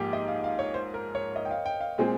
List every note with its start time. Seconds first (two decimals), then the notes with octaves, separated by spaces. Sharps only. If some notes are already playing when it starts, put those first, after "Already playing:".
Already playing: G#2 F3 A#3 G4
0.13 D#5
0.28 F5
0.44 F5
0.59 C#5
0.74 C5
0.94 A#4
1.15 C#5
1.36 D#5
1.45 G5
1.51 F5
1.66 G5
1.81 F5
1.98 A#2 G#3 C4